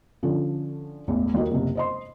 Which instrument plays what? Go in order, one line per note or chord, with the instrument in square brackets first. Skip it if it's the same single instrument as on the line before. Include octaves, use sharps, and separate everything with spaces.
[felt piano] D3 F3 C#4
E1 A1 E2
D#2 A#3 F#4 D#5
F#1 C3
C5 D#5 C6